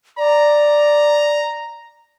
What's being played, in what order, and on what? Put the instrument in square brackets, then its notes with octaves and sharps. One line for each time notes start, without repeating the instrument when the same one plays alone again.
[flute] D5 [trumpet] A#5